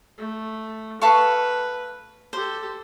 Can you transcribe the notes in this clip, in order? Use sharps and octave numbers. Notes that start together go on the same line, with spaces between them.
A3
A4 B4 F5 C#6
G4 A4 C5